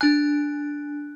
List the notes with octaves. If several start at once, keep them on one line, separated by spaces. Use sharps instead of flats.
D4 G#5 F#6